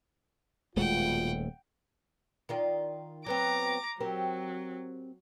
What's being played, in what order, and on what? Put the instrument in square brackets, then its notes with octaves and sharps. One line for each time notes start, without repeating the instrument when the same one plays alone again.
[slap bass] D#1 G#3 A3 [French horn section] B2 F4 [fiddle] F#5 G5
[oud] D#3 F4 D5
[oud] F#3 B3 C4 [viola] A#5 D6
[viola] F#3 [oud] C4 G4 A#4